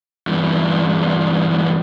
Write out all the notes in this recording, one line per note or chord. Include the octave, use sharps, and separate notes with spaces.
E2 G2